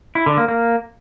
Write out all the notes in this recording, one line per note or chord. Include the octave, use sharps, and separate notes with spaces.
E4
D3
A#3
A#3